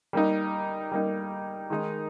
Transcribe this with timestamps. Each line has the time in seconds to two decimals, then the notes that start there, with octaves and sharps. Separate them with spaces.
0.13 G3 A#3 D#4
0.92 G3 A#3 D#4
1.70 D#3 G#3 D#4